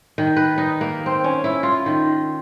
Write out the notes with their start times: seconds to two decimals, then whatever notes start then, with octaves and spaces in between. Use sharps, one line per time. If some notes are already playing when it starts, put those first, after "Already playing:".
0.18 D#3
0.36 B4
0.58 D#4
0.81 A#3
1.06 C4
1.24 C#4
1.44 E4
1.63 F4
1.86 D#3